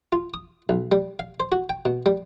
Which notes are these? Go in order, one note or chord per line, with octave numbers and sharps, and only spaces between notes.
F4
D#6
B1
G3
F5
C5
F#4
G5
B2
G3